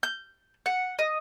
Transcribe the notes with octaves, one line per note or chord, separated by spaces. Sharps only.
G6
F#5
D#5